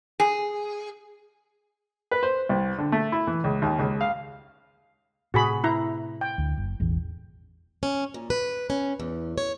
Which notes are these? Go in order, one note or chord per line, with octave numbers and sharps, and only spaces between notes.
G#4
B4
C5
C2
D3
A3
E4
E3
C#2
D#2
C#2
F5
A2 C3 F#4 G#4 B5
E4 A#5
G5
D2
F#1
E1 A1 E2
C#4
A#2
B4
C#4
E2
C#5